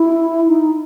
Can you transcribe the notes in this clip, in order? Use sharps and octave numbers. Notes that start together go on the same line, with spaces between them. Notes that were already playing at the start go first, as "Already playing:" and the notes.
Already playing: E4
D#4